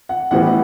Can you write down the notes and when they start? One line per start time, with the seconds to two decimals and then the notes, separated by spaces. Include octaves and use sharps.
0.09 F#5
0.31 A1 A2 G3 B3 F#5